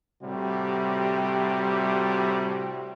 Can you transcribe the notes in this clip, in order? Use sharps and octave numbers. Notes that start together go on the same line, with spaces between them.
A2 C3 G3 F#4